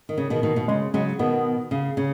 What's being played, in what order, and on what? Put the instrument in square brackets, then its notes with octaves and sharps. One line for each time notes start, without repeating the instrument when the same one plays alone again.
[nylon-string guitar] D#3
C#3
B2 D#3
B2 D#3
B2
[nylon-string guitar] C#3 [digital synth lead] G#3
[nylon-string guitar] C#3 F#3 [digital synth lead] G#3
[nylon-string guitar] B2 D#3 [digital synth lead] B3
[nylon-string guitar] C#3
C#3